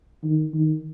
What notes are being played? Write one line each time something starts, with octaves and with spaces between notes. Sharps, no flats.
D#3
D#3